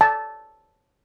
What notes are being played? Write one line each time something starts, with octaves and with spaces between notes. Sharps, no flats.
A5